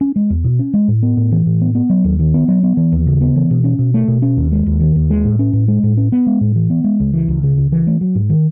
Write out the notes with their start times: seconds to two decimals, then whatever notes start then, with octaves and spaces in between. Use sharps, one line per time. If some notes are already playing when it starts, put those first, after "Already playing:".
0.01 C#4
0.16 G#3
0.30 E2
0.44 B2
0.59 C#4
0.74 G#3
0.88 A2
1.03 B3
1.17 A2
1.32 E3
1.46 A2
1.61 B3
1.75 B3
1.90 F#3
2.04 D#2
2.20 D#3
2.34 B3
2.48 F#3
2.63 B3
2.77 E3
2.92 D#2
3.06 C#3
3.21 B3
3.36 E3
3.51 B2
3.64 C#4
3.79 B2
3.94 A3
4.08 B2
4.22 C#4
4.37 D#2
4.52 G#3
4.66 D#2
4.80 D#3
4.96 D#2
5.10 G#3
5.25 A2
5.39 C#4
5.53 A2
5.68 G#3
5.83 A2
5.97 C#4
6.12 B3
6.26 G#3
6.41 A2
6.56 E3
6.70 B3
6.84 G#3
7.00 C#2
7.13 E3
7.28 C#2
7.43 C#3
7.58 C#2
7.72 E3
7.87 A3
8.01 F#3
8.15 G#2
8.30 D#3